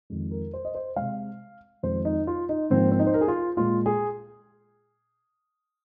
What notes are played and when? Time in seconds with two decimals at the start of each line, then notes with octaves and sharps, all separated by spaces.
0.10 F2 D#3 G#3
0.31 A#4
0.54 C5
0.65 D#5
0.75 C5
0.96 C3 G#3 F5
1.83 F2 D#3 G#3 C5
2.05 D#4
2.27 F4
2.49 D#4
2.70 G#2 F3 A#3 C4
2.91 C4
2.99 D#4
3.07 C5
3.14 A#4
3.21 G#4
3.28 F4
3.57 A#2 G#3 F4
3.86 G#4